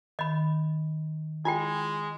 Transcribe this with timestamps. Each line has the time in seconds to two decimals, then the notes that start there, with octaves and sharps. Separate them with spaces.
0.19 D#3 D#5 B5
1.45 G#3 E4 F4 G5 G#5